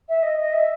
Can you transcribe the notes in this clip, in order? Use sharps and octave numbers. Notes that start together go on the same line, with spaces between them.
E5
D#5
D#5
E5